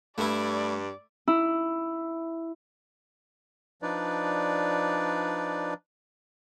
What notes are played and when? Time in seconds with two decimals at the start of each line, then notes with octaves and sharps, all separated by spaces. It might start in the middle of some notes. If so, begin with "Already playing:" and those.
0.18 G2 A3 E4 D5
1.28 E4
3.82 F3 D4 D#4 B4 D5